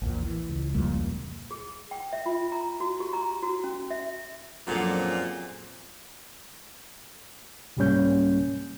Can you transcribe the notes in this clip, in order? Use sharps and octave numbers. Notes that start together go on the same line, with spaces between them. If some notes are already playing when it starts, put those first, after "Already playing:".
A#1 E2 A#2
E3
C#2
F2 A#2 G3
G#4
G5
E5
F4
A#5
F#4
G4
A#5
F#4
C#4
E5
F#2 A#2 D3 F3 C4 G#4 F#5
C2 G#2 G3 A#3 C#4 G6